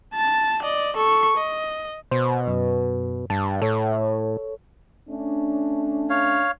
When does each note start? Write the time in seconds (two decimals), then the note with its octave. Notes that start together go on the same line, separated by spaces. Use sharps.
0.14 A5 A6
0.63 D5 D#5
0.96 A4 C#6
1.37 D#5
2.11 B2 C5
2.47 F#2
3.30 G2 A5
3.62 A2 A4 C#5
5.10 A3 C#4 D4
6.10 C#5 F5